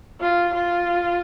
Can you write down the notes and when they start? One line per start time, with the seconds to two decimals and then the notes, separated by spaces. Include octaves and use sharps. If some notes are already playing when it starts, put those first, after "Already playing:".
0.21 F4
0.54 F4